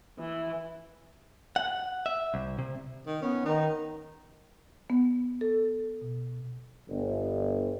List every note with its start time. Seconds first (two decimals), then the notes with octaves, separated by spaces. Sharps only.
0.19 E3
1.56 F#5
2.06 E5
2.34 C2
2.59 C3
3.07 D#3
3.22 B3 C#4
3.45 D#3 D#4
4.90 B3
5.41 A4
6.01 B2
6.89 G1